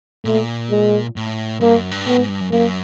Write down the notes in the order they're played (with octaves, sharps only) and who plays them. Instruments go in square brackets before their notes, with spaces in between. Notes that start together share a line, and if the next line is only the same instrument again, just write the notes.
[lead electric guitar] A#2 [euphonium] A3
[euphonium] G#3
[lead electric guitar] A2
[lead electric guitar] G2 [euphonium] A#3
[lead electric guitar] F#2
G2
[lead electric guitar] A2 [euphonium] B3
[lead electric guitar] G#2
G2
F#2
[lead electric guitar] F#2 [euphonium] A#3